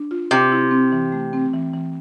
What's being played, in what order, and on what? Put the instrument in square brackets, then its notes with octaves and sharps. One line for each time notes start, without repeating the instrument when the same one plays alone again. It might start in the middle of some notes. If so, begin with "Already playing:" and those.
Already playing: [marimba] D4
F4
[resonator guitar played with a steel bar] C3 [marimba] C4
[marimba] E4
C4
E3
A3
C4
E3
E3